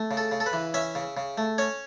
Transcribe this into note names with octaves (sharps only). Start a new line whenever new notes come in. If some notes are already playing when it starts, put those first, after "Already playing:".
Already playing: A3
C#3
A4
C#3
A4
B4
E3
C#4 E5
C#3
C#3
A3
C#4 C#5